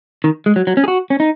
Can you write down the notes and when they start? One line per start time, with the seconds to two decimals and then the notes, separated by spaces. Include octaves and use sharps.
0.24 D#3
0.46 G#3
0.56 F#3
0.67 F#3
0.77 C#4
0.84 G#4
0.88 F#4
1.10 C#4
1.20 D#4